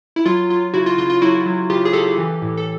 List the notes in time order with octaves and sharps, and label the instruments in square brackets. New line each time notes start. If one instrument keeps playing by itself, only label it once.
[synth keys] E4
F#3 F4
F#3 F4
C#3 E4 F#4
F4
C#3 F4
F4
F#3 E4 F#4
F#3
C#3 F4 G4
G#4
C#3 G4 A4
E3
A2
A4